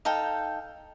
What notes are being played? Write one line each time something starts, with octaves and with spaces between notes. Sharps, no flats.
D#4 A4 F5 G5